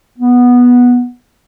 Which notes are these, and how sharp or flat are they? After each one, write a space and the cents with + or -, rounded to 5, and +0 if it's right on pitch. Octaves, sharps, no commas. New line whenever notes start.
B3 -10